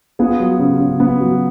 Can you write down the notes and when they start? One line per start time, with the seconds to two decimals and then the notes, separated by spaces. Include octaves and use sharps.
0.19 B3 F4 G#4
0.40 F#3
0.59 C#3
0.80 C#3
1.00 B3
1.20 F#3